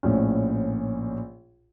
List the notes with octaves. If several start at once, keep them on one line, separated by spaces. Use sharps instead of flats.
A#1 A2 C#4